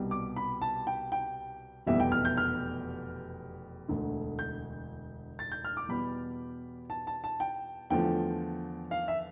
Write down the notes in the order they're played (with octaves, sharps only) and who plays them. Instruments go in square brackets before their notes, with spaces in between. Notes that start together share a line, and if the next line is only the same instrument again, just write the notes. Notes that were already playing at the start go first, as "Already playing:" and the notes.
Already playing: [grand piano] C2 B2 G3
D6
B5
A5
G5
G5
F1 E2 B2 G3 E5
G5
F6
G6
F6
E1 D2 D3 A3
G6
A6
G6
F6
D6
E2 B2 G3 B5
A5
A5
A5
G5
E2 D3 F3 A3 G5
F5
E5